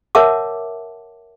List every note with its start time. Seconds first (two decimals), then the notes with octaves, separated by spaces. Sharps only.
0.15 A#4 C#5 E5 F#5 A5 D6